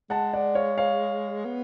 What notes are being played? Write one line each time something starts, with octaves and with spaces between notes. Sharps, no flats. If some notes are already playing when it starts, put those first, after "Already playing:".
G#3 F#5 A5
D5 F#5
C#5 F5
C#5 F5
B3